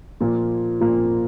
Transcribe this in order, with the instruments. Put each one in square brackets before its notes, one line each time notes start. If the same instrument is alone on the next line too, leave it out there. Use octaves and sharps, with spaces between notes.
[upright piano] A#2 F3 A#3 F4
A#2 F3 A#3 F4